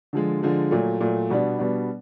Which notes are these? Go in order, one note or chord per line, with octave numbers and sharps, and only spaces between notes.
D3 F3 G#3
D3 F3 G#3
A#2 F#3 A3
A#2 F#3 A3
B2 G3 B3 D4
B2 G3 B3 D4